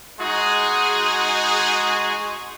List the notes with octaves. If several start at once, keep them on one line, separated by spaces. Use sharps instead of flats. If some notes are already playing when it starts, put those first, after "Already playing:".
G#3 D#4 F#4 G#4